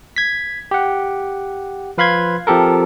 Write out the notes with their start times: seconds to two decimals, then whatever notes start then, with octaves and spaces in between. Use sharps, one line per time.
0.16 G#6 B6
0.71 G4 F#5
1.98 F3 B4 F5 B5 C6 G#6
2.47 F3 C4 G4 A4 A#4